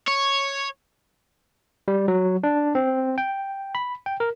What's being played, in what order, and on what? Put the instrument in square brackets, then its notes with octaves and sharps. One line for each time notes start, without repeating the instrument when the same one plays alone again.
[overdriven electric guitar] C#5
[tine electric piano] G3
F#3
D4
C4
G5
B5
G5
A#4